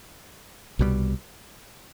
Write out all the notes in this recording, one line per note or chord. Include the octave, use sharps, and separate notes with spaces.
C2 B2 G3